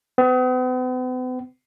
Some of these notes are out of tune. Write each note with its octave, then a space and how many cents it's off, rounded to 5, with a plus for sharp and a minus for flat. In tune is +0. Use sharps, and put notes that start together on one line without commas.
B3 +45